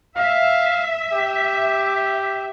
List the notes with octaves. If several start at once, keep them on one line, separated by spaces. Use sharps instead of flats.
E5 F5
G4